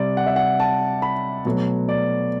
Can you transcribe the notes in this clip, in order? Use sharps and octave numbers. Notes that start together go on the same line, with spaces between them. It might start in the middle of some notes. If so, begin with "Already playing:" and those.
Already playing: C3 G3 D5
F#5
E5
F#5
A5
B5
B2 F#3 A3
D5